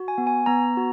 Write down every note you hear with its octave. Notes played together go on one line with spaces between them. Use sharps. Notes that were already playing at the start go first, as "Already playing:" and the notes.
Already playing: F#4
G#5
B3
G#5
B3 A#5
F#4